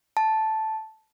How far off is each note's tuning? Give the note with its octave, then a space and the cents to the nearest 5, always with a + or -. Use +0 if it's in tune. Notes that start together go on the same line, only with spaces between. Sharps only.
A5 -5